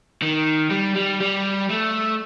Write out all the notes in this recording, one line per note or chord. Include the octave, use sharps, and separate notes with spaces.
D#3
G3
G3
G3
A3